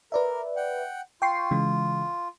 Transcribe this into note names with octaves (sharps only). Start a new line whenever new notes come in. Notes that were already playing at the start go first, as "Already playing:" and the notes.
A#4 B4 D5 E5
F#5 G5
F4 G5 C#6 C7
C#3 E3 G#3